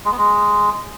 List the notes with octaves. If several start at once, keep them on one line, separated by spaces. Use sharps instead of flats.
G#3
B3
G#3